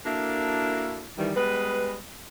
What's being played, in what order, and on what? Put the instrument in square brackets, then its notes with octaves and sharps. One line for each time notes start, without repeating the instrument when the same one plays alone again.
[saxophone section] A#3 D4 E4 F#4 A4 A#4
D#3 E3 G3
G3 G#3 B3 B4